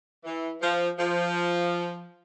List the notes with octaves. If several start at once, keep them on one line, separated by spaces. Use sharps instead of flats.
E3
F3
F3